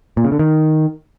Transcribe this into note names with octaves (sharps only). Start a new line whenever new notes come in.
A#2
C#3
D3
D#3